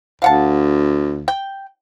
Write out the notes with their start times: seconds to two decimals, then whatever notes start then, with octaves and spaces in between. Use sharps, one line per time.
0.22 D2 F5 F#5 A5
1.28 G5